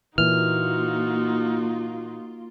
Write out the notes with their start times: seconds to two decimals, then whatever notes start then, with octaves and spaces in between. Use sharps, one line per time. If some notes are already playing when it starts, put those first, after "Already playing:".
0.18 A#2 E3 A#3 D#4 F4 F#4 F6